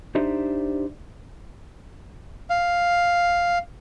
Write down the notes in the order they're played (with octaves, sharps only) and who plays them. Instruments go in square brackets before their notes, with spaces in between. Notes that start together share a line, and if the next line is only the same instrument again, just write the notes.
[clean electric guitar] D4 D#4 G4 C5 D5 E5
[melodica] F5